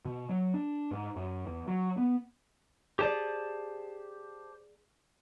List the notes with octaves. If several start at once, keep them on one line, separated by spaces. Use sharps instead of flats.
B2
F#3
D4
G#2
F#2
E2
F#3
B3
G4 G#4 C5 D5 A5